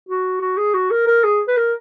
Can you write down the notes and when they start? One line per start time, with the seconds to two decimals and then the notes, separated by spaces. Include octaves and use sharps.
0.09 F#4
0.41 F#4
0.58 G#4
0.74 F#4
0.91 A#4
1.07 A#4
1.24 G#4
1.48 B4
1.57 A#4